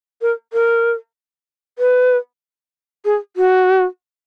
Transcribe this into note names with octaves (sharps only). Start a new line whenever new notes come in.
A#4
A#4
B4
G#4
F#4